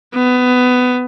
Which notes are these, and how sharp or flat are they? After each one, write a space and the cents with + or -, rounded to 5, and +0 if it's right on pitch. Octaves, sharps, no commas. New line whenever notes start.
B3 +20